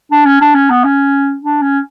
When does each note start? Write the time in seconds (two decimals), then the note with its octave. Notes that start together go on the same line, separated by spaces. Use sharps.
0.12 D4
0.26 C#4
0.41 D4
0.55 C#4
0.70 B3
0.84 C#4
1.43 D4
1.62 C#4